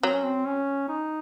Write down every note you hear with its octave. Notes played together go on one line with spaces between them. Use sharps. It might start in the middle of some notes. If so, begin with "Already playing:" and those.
F#3 C4
C#4
C4
C#4
D#4